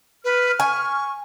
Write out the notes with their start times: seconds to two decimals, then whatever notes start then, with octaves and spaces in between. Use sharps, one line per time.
0.25 B4 F6
0.60 G#5 C#6